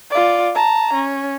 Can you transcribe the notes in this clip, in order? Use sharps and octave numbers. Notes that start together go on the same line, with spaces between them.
F4 D5
A5 A#5
C#4